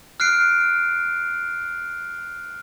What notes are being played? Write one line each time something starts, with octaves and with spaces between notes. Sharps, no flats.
F6 F#6 C7 D7